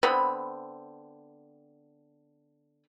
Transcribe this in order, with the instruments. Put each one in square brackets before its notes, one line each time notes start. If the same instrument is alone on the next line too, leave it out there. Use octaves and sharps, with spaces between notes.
[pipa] D3 B3 C4 B5